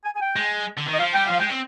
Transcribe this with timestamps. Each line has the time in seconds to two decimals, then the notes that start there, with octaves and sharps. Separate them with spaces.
0.05 G#5
0.15 G#5
0.21 G5
0.36 G#3
0.77 D3
0.87 D#3
0.93 D#5
0.98 F3 F5
1.14 G3 G5
1.26 F3 F5
1.39 G#3 G5
1.49 C4